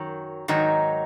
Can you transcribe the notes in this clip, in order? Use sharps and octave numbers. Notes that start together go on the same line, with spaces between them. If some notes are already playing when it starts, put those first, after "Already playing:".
Already playing: F#2 D#3 F#3
G#2 D#3 F#3 D#4